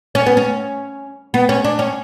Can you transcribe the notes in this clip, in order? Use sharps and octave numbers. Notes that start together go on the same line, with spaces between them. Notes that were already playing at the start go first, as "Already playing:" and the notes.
C#4
B3
C#4
B3
C#4
D4
C#4